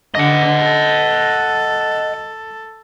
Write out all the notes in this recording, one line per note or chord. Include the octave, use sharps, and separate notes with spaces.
D3 D#5 F#5
A4